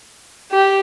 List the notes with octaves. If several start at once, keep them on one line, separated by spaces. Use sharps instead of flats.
G4